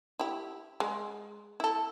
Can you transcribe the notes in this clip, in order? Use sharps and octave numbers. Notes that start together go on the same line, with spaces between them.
E4 G4
G#3
E4 A4